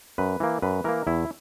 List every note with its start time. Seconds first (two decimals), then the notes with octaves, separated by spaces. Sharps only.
0.18 F#2 B4
0.40 E3 A#3
0.62 F#2 B4
0.84 E3 A#3 A#4
1.07 E2 E4